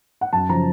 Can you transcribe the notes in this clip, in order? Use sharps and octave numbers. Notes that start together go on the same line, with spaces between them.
F#5
F#2 A5
C#3 F3 A#5